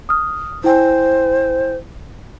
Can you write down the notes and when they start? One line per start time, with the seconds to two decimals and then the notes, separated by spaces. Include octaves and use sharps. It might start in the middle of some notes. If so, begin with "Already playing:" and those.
0.09 D#6 F6
0.64 E4 C5 G5 G#5